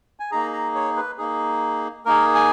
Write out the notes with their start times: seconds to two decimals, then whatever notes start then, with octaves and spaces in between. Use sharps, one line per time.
0.20 G#5
0.31 A#3 D#4 G#4 A#5
0.53 A#5
0.75 C#5
0.96 B4
1.18 A#3 D#4 G#4
2.05 A#3 D#4 G#4 A#4
2.35 G#5